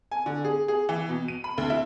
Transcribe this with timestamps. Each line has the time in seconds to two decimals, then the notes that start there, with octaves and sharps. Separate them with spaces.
0.11 G#5
0.26 D3
0.45 G#4
0.68 G#4
0.89 E3
1.09 B2
1.28 D#7
1.44 B5
1.58 D2
1.70 E4